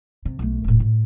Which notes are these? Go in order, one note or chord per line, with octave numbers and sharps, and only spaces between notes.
C3
B1 A3
E1 A2
A2